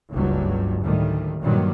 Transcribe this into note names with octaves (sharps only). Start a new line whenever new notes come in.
F#1 C#2 G2 F#3
D2 A2 D#3 G3
G2 A#2 D#3 F#3 G3